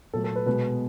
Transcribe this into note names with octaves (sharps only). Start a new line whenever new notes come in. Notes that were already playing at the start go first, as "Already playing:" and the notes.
A#2 F#3 A3 A4
A4
B4
B2 G#3 B4